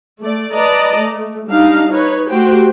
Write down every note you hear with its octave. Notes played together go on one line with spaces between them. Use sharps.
A3 D5
B4 D5 D#5 A5 A#5
A3
G3 D4 D#4 F5
D#4 B4 C#5
A3 F#4 G4 C5 G5